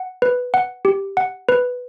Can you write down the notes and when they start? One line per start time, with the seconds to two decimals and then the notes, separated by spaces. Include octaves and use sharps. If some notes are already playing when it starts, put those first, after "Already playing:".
Already playing: F#5
0.22 B4
0.54 F#5
0.85 G4
1.17 F#5
1.49 B4